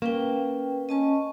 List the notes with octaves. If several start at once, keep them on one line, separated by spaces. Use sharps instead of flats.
A#3 C#4 B4 G5
C#4 D#5 A5 C#6